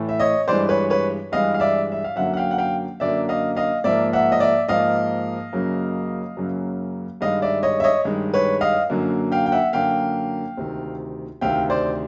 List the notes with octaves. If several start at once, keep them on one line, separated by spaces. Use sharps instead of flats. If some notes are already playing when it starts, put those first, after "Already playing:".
Already playing: A2 E3 A3
E5
C#5 D#5
G2 E3 G#3 C5 D5
B4 C#5
B4 C#5
G2 E3 G#3 D#5 F5
F5
D5 E5
E5
F5
F#2 D3 F#3 A#3 E5 F#5
F#5
F5 G5
F#5
F5 G5
F#2 D3 F#3 A#3 D5 E5
D#5 F5
D#5 F5
G#2 F3 A#3 D5 E5
E5 F#5
D#5
D5 E5
G#2 F3 A#3 D#5 F5
F#2 C#3 F#3 A#3
F#2 C#3 F#3 A#3
G2 D#3 G#3 D#5 F5
D5 E5
C#5 D#5
E5
C#5 D#5
G2 D#3 G#3
B4 C#5
D#5 F5
F#2 D3 F#3 A#3
F5 G5
G5
E5 F#5
F#2 D3 F#3 A#3 F5 G5
D2 C3 D#3
D2 C3 D#3 F5 G5
C5 D5